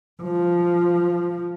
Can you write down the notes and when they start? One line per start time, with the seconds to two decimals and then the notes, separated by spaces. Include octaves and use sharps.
0.22 F3